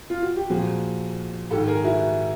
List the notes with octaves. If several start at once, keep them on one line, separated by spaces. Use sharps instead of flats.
F4
F#4
G4
A#2 F3 F#4 G#4
G#2 D#3 G4 A4
G#4 A#4
E4 F#4